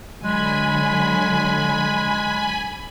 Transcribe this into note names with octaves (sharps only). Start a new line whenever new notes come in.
D3 F#3 G#3 G#5 B5